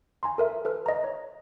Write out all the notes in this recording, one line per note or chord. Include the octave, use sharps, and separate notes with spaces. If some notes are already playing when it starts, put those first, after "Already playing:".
G#5 A#5 C6
A4 A#4 E5
A4 B4 F6
D#5 A#5
C#5